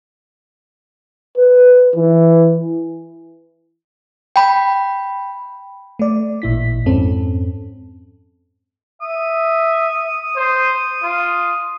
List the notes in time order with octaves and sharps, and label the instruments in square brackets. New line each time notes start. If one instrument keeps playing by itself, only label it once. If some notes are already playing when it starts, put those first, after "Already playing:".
[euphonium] B4
E3
[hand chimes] G5 B5
[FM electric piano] A3 D5
A1 A#2 E4 B6
F2 G#2 C4 C#4 A4
[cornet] E5 [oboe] D#6
[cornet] C5
F4